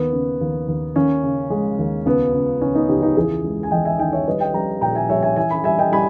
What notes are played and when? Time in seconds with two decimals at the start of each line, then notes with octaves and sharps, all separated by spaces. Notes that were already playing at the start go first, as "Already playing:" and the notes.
Already playing: D#2 D#3 B3
0.13 C#3
0.41 D#2
0.68 D#2
0.96 D#2 C#4
1.23 C#3
1.50 G#3
1.79 D#2
2.05 C#2 B3
2.34 C#2
2.61 C#2 C#4
2.75 B3 D#4
2.89 C#2 D#4 G4
3.02 D#4 G4
3.17 E2 E4 G#4
3.44 G#3
3.63 G#5
3.71 E2 D#5 G5
3.85 E5 G#5
3.99 D#3 D#5 G5
4.12 C#5 E5
4.27 G3 B4 D#5
4.40 D#5 G5
4.54 G3 G5 A#5
4.81 A#2 G5 A#5
4.95 E5 G#5
5.09 G3 C#5 E5
5.23 E5 G#5
5.36 E3 E5 G#5
5.51 G#5 B5
5.64 G3 E5 G#5
5.78 D#5 G5
5.92 G3 G#5 B5